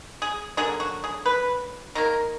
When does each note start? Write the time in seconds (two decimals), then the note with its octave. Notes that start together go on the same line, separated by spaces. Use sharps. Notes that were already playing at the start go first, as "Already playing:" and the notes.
0.22 G#4
0.57 D3 F#3 A#3 G#4
0.80 F#4
1.04 G#4
1.26 B4
1.95 D#3 A#3 A#4